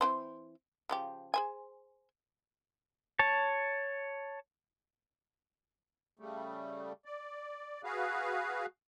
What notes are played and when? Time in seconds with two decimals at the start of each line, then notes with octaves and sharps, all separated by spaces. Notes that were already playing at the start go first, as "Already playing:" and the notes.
0.01 E3 C4 C5
0.89 C#3 F3 G4
1.34 G#4 C5 G#5
3.19 C#5 A5
6.19 C#3 G3 A3
7.05 D5
7.84 F#4 G#4 B4 F5